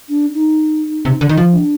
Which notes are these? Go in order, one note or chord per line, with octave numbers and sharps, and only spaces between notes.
D4
D#4
C3
D3
D#3
F3
D4